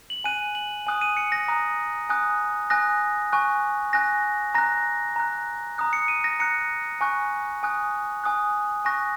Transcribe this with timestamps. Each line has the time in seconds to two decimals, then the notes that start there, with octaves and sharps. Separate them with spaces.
0.10 F#7
0.24 G#5 F#6 D#7
0.55 F#7
0.87 G#5 D#6 F#6
1.01 D#7
1.17 C#7
1.32 A#6
1.48 A#5 D#6 F#6
2.09 G#5 D#6 F#6
2.70 G#5 D#6 F#6 A#6
3.32 G#5 C#6 F#6
3.93 G#5 F#6 A#6
4.55 A#5 F#6 A#6
5.16 A#5 F#6
5.78 A#5 D#6 F#6
5.93 C#7
6.08 D#7
6.24 A#6
6.40 A#5 F#6 C#7
7.01 G#5 C#6 F#6
7.63 G#5 D#6 F#6
8.24 G#5 D#6 F#6
8.85 G#5 C#6 F#6 A#6